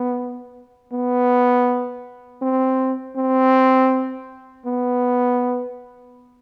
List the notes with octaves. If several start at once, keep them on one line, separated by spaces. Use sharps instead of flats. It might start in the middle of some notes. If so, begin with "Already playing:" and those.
Already playing: B3
B3
C4
C4
B3